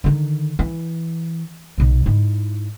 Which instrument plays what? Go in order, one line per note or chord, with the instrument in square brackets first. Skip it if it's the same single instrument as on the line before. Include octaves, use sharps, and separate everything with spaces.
[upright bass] D3 D#3
E3
B1 C3
G#2 E4